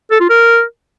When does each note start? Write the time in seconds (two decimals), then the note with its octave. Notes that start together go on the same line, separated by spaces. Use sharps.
0.12 A4
0.21 F4
0.30 A#4